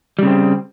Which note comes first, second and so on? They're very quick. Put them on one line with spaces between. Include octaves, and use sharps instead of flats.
G3 C#3 C4